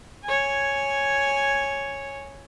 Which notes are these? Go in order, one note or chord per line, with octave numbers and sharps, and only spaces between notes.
C#5 G#5